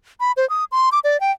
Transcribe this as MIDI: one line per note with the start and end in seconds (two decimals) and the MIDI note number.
0.20 0.32 83
0.37 0.48 72
0.50 0.64 87
0.72 0.89 84
0.92 0.99 86
1.04 1.19 74
1.20 1.31 79